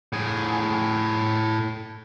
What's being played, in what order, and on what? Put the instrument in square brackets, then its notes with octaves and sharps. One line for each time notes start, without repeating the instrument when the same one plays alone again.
[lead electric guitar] A2 G#4